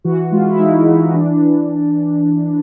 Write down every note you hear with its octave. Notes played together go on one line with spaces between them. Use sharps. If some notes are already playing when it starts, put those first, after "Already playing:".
E3 F#4
G#3 F4
E4
G#3 D#4
E3
D#4
E3 D4
E3